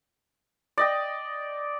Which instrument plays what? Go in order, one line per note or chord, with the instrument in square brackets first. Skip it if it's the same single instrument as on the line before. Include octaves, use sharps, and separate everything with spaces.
[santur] D5 D#5 G5